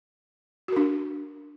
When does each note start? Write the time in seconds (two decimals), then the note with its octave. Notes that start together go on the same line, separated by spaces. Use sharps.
0.68 F#4
0.72 A#4
0.76 D4